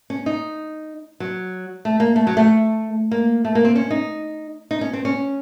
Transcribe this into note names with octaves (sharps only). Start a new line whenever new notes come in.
C#4
D#4
F#3
A3
A#3
A3
F#3
A3
A#3
A3
A#3
C4
C#4
D#4
D#4
C#4
C4
C#4